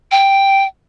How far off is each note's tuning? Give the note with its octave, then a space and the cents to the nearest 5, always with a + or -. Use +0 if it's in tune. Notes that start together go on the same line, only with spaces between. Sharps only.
G5 +0